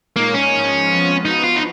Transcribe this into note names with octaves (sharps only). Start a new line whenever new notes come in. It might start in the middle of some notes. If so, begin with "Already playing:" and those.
A#2 G#3 A#3 D#4 A#4 C#5
C#4
G#2 F3 G#3 D#4 A#4
F2 F3 G#3 B3 F4
F3 B3 D#4 F#4 B4
F4
D#4